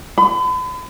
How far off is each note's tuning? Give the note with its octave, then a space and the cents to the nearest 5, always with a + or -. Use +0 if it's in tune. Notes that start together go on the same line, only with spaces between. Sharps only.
B5 +40